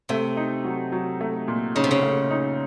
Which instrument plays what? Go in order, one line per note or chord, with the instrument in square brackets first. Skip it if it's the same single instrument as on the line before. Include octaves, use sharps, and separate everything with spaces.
[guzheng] C3 [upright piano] A3
[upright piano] D#4
F#3
F#3
A3
A#2
[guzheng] C#3 [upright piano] D#4
[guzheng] C3
C#3
[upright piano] A3
D#4